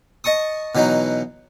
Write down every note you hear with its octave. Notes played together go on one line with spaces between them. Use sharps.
D#5 A5 C#6 D#6
B2 E3 F#3 D#4